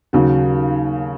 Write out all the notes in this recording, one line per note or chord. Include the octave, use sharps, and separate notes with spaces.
D#2 C#3 F#3